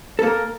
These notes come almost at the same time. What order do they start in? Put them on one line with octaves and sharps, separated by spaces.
A4 A#3 A#4